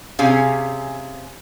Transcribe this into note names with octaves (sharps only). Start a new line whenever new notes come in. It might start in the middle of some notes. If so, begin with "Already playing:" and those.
C3 C#4 G#4 F5 G#5